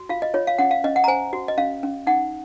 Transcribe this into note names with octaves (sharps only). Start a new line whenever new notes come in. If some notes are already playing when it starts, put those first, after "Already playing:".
Already playing: F#4
F4 F5
D#5
F4 C#5
F5
C#4 F#5
F5
C#4 D#5
F#5
A#5
C5 G#5
F#4
D#5
C#4 F5
C#4
D#4 F#5